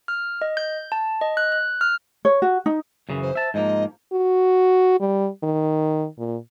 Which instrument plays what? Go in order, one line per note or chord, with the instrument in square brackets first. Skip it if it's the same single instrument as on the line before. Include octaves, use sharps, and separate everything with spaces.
[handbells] F6
D#5
G6
A5
D#5
F#6
F#6
F6
[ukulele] C#5
F#4
D#4
[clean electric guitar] F#2 C#3 E3
[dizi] C5
[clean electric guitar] E5 A5
[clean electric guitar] G#2 F3 A#3 [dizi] D#5
[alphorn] F#4
G3
D#3
A#2